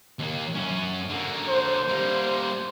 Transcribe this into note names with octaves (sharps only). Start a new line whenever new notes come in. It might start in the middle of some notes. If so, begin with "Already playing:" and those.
D#2 A#3
F#2 C#4
D3 A#3
C5
G3 A#3